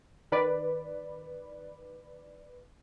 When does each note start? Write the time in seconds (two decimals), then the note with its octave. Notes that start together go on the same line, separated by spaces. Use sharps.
0.32 D#3 B4 D5